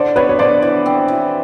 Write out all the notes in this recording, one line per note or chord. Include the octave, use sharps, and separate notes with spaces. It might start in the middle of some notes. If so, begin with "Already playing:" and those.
Already playing: D3 E4 C5 D5
B3 B4 C#5
C#5
D3 C5 D5
E3
C4
E3